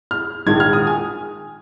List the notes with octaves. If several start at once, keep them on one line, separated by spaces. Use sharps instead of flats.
F6
A#1 G#2 D#3 G#6
F6
D#6
G#5